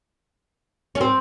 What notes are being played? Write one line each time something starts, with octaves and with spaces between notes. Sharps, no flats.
C#4
C4